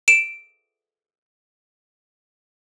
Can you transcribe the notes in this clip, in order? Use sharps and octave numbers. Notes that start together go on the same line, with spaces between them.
D7 E7